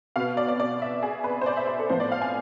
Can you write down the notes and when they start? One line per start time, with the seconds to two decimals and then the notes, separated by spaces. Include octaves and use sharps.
0.16 B2 B3 F5
0.37 D5
0.48 D5
0.60 D5
0.82 E5
1.03 G#4
1.24 B4
1.41 C5
1.46 D5
1.57 E5
1.67 C5
1.79 A4
1.90 A2 F3 B3 C5
2.00 D5
2.12 F5
2.22 G#5